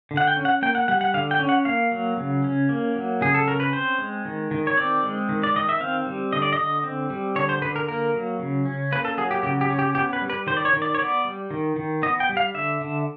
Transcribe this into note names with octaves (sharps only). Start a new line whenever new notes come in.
D3
F#5
G5
C#4
F#5
A#3 G5
F#5
G3 F#5
F#5
D3 F5
G5
C#4
F#5
A#3 F5
F#3
C#3
C#4
A#3
F#3
C#3 G#4
A4
C#4 A#4
B4
C4 C5
G#3
D#3
D#3
C#5
C4 D5
G#3
D#3
D5
D#3 D#5
E5
C4 F5
G3
D3 D#5
D5
D#5
D3
C4
G3
D3 C#5
C5
D3 B4
A#4
A#3 A#4
F#3
C#3
C#4
A#3 B4
A4
F#3 G#4
G4
C#3 G4
G4
C#4
G4
B3 G4
B4
G3
B4
D#3 C5
D5
C#5
D#3
D5
C#5
B3 D5
G3
D#3
D#3
B3 D#5
G5
G3
F5
D3 E5
D3